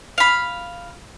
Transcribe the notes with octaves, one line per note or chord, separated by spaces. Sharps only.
F5 B5